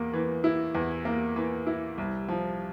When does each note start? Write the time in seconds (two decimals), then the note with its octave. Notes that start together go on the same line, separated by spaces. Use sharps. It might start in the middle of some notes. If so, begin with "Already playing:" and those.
Already playing: E2 A#3
0.14 E3
0.44 E4
0.75 E2
1.05 A#3
1.36 E3
1.67 E4
1.98 C2
2.29 F3